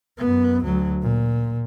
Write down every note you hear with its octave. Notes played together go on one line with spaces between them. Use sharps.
F#2 B3
D2 F#3
A#2